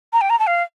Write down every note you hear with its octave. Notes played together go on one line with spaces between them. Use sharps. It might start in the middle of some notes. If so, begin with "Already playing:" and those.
A#5
G5
A#5
A5
F5